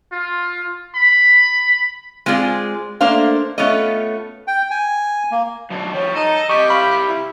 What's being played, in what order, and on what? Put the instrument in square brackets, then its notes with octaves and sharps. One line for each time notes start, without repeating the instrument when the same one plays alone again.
[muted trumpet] F4
B5
[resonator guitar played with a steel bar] G#3 C4 F4 G#4 D5
A3 A#3 D4 C5 F5
A3 B3 C#4 F4 C#5 D#5
[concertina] G5
G#5
A#3
[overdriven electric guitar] F#2 B2 [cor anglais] D4
[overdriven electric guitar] F3 G3 [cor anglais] C#5
[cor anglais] D#4 [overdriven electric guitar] A4 [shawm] D#5
[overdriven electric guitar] C3 G3 [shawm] G4 [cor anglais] D#5 [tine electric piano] C#6
[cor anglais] F5 [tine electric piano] B5
[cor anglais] E4